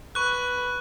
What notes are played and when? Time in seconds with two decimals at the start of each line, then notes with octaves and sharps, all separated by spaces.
0.15 B4 C#6 F#6